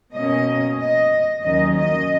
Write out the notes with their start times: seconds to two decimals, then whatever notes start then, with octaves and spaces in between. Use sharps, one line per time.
0.14 B2 A#3 C#4 D#5
0.78 D#5
1.43 D#2 D#3 F#3 C#4 D#5
1.75 D#5